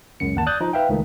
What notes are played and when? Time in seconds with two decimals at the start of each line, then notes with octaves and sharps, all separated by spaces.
0.20 C#2 F#2 C#7
0.35 G1 D#2 F#5 A5
0.46 D5 D#6 F#6 G6 A6
0.61 F3 D#4
0.73 B4 E5 F5 G5
0.89 C#2 D#3 A3